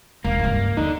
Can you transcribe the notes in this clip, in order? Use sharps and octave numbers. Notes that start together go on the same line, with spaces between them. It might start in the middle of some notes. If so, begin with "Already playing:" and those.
E1 A#3
C#2 G2 E3
D#2 D3 D#4